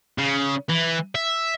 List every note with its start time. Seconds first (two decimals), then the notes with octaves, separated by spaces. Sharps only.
0.18 C#3
0.69 E3
1.15 E5